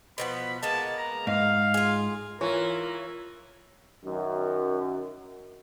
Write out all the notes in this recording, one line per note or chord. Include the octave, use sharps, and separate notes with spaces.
B2 F3 B3 B5
G#3 A#3 B3 A5
A#5
G#2 F5
F4 G#4
E3 F4 A#4 C#5
F#2 D#3